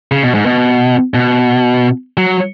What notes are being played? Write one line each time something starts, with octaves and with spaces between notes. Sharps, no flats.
C#3
B2
G#2
B2
B2
F#3